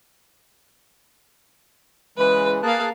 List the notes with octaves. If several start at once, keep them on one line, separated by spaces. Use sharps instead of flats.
C#3 E3 G#3 B4
A#3 G#4 F5 A5 F#6